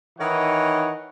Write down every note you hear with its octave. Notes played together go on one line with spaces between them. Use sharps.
D#3 E3 D#4 C#5 F#5